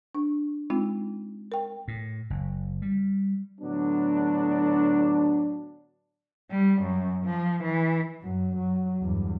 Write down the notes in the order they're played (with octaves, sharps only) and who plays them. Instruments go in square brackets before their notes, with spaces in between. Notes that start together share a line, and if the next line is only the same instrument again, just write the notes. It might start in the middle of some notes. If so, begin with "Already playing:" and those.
[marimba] D4
G#3 C4 D#4 F4
A#4 G5
[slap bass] A2
F#1
G3
[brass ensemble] A2 D3 F#3 B3 D4
[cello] G3
F#2
F3
E3
[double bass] F#2 F#3
F#3
E2 G2